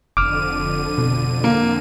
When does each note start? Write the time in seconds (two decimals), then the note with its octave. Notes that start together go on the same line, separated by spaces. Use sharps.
0.17 F1 F2 D3 D6 F6 D#7
0.98 B2
1.44 A#3